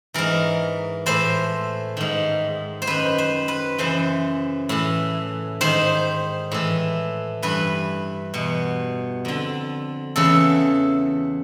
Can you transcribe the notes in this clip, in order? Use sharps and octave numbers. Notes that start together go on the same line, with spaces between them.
G#2 E3 A#4
A2 E3 C5
G#2 D#3
C5
F#2 D#3 B4
C5
B4
F#2 C#3 E3 C5
A2 E3
G#2 D#3 C5
A2 E3
G2 E3 B4
E2 B2
F2 D3
E2 C#3 E3 A4